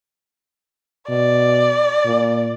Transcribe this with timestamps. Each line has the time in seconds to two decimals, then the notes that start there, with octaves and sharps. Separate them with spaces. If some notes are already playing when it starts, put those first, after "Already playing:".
1.09 B2 D5
2.05 A#2